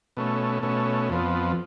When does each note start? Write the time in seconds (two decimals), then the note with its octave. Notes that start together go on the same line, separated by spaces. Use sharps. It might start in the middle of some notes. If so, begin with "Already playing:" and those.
0.17 B2 A3 C#4
0.62 B2 A3 C#4
1.10 F2 F3 B3